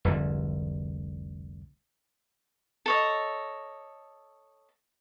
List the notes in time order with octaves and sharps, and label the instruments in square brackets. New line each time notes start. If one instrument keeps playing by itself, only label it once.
[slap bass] F1 C2 G#2 D3
[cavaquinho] A4 C#5 D#5